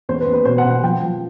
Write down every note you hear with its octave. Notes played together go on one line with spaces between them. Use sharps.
E2 C5
B4
E2
B4
B2 C5
F#5
B2
F#5
F3 G5
F3